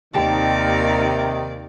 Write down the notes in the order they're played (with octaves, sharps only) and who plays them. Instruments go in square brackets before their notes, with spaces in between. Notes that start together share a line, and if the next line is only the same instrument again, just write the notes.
[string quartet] D#2 D5 [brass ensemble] C3 D#3 [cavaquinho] G4 A5 D6